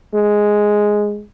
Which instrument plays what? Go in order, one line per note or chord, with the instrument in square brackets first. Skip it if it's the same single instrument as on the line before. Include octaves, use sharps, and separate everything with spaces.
[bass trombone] G#3